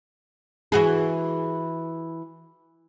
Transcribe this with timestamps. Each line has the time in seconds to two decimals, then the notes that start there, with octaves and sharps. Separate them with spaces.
0.72 E3 F#4 G#4